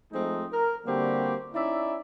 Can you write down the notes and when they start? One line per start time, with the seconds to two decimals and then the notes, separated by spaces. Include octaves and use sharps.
0.13 F3 G#3 A3 C4 D#4
0.53 A#4
0.85 D3 G3 A#3 C4 F#4 G4
1.54 C#4 D#4 E4 D5 E5